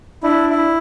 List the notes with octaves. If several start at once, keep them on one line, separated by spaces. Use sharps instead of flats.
D4 E4
E4